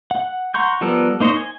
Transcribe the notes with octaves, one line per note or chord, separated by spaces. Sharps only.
F#5
F#5 A#5 C6 C#6 G6
F3 G3 B3 A4 A#4
A#3 D#4 C5 C#5 D#5
G#5